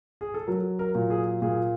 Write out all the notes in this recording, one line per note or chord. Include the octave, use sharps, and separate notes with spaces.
G#4
A4
F#3 A#4
A#4
A#2
G#4
A#2 G#4